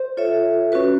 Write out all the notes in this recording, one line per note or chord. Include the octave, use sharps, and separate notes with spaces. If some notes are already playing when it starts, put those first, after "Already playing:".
Already playing: C5
F4 A4 C#5 E5
C#4 F#4 B4